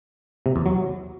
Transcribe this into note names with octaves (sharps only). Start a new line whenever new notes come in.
C3
E2
F#3